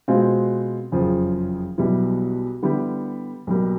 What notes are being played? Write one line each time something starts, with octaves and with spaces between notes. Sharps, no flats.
B2 G#3 C4 F4
F#1 F2 C#3 F3
B1 B2 G3 B3 E4
D3 G3 B3 E4 G4
B1 B2 G3 A#3